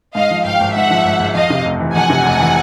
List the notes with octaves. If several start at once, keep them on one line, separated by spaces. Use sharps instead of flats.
G#2 D#5 F5
F3
G#1 F5 G5
G#1
G#2 E5 F#5
F3
G#1
G#1
F2 D#5 F5
C3
F1
E3
F2 F#5 G#5
C3
F1
E3